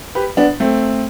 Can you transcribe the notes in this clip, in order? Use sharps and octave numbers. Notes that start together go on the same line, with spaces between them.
G4 B4
B3 D4
A3 C4